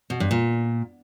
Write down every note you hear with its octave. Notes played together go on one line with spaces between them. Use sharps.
B2
G2
A#2